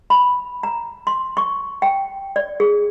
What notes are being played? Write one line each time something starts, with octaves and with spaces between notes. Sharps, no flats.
B5
A#5
C6
C#6
G5
D5
G#4